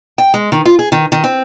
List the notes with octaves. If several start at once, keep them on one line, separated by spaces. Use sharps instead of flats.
G5
G#3
D#3
F4
G#4
D#3
D#3
C4